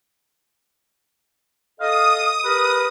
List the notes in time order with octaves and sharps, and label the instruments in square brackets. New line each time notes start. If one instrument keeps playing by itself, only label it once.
[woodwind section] A4 D#5 F5 [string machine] D#6
[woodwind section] G4 A#4 B4